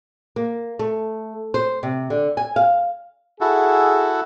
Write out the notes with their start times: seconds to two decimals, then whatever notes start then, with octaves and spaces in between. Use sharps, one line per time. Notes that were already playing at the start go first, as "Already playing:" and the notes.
0.36 A#3
0.79 A3
1.54 C5
1.83 C3
2.10 D3
2.37 G#5
2.56 F5
3.41 E4 F#4 G#4 A4